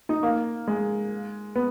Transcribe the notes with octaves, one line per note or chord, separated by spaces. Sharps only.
D#4
A#3
G#3
B3